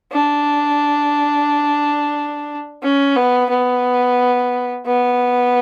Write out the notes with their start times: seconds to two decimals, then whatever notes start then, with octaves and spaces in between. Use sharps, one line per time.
0.12 D4
2.83 C#4
3.16 B3
3.50 B3
4.86 B3